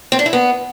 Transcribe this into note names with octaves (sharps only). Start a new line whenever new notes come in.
C4
D4
E4
B3